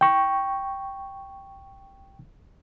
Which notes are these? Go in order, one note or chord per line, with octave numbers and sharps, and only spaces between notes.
G5 C#6